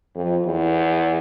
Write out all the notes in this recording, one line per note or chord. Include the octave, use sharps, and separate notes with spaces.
F2
E2